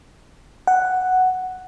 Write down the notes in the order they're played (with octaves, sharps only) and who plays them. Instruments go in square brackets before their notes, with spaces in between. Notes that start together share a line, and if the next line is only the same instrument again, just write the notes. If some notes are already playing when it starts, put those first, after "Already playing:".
[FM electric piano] F#5